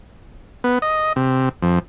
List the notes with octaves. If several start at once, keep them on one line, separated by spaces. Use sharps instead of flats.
B3
D#5
C3
F2